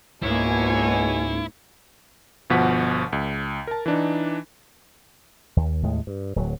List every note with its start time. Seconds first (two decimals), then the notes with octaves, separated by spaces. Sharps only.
0.23 C#2 G#2 B2 A#3 E4 C#5 G#5
2.50 G1 B2 F3 F#5 B6
3.12 C#2
3.67 A#4 A5
3.86 E3 D4 D#4
5.57 D#2
5.83 D#2 A2 G#3
6.07 G2
6.36 D1 F#3